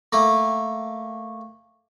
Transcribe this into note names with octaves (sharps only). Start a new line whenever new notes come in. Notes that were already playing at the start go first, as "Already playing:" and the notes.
A3 A#3